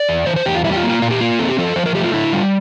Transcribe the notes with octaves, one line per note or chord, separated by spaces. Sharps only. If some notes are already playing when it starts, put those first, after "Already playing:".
Already playing: D5
E2
E3 C5
C5
E2 G4
F4
G3 E4
G4
F4
A#3
F4
A#2 F4
G4
A#3 F4
C4 A4
G4
F3 A4
F3 C5
A#4
A3 G4
F4
D3 E4
G3 F4